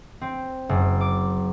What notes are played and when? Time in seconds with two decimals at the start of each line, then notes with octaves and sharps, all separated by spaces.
0.21 C4
0.69 F#1
1.01 D6